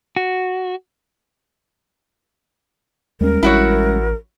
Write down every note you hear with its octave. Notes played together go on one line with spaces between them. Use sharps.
F#4
D#2 G3 G#3 C#4 A#4
A1 E4 F#4 C#5